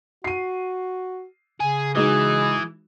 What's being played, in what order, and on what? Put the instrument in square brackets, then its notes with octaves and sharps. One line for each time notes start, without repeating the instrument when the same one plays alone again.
[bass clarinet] F#4 [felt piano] C7 D#7
[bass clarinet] C#3 [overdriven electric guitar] G#4
[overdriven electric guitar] E3 [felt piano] G#3 D#4 F#4 [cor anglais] G#4